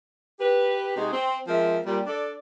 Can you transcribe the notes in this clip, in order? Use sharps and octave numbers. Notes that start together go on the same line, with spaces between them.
G4 B4
C3 G#3 D#4 F#4 G#4
C4
F3 G#3 C4 A#4 E5
A#2 G3
D4 A4 D5